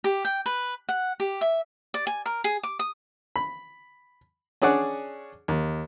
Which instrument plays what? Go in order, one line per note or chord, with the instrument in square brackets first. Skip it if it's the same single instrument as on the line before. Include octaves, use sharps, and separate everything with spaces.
[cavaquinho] G4
G5
B4
F#5
G4
E5
D5
G#5
A#4
G#4
D6
D#6
[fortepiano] B5
C#4 D4 G#4 D5 F#5
D#2